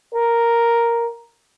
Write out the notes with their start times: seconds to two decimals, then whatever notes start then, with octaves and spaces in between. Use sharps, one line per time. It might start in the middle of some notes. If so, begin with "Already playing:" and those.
0.14 A#4